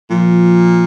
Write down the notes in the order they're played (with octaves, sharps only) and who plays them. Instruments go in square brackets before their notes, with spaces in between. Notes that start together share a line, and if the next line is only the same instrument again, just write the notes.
[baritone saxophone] A#2 [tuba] F3